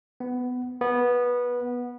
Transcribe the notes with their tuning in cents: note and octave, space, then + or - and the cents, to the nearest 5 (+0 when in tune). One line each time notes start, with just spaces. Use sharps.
B3 +15
B3 -15